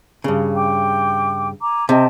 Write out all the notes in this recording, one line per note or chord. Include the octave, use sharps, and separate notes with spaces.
G2 C#3
G5 D6
G#5 A#5 D6
C3 D#5 G5 A5